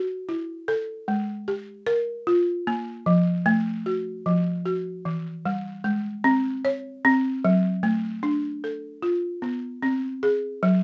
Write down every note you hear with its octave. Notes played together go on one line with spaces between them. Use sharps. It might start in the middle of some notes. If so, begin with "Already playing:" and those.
Already playing: F#4
E4
A4
G#3
G4
A#4
F4
A#3
F3
A3
F#4
F3
F#4
E3
G3
G#3
C4
C#5
C4
F#3
A3
D4
A4
F4
B3
C4
G#4
F#3